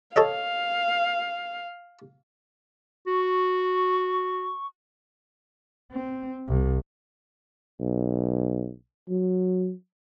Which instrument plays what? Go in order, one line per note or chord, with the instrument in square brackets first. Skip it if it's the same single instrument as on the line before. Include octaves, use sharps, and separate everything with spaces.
[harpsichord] A4 C#5 D#5 [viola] F5
[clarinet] F#4 [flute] C#6
[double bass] C4
C2
[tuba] B1
F#3